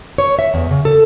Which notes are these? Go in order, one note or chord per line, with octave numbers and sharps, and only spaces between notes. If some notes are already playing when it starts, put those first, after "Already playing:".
C#5
E5
E2
C#3
A4